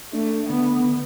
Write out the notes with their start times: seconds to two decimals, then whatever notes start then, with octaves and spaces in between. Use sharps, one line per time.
0.13 A3 D4
0.49 D3 B3
0.84 D3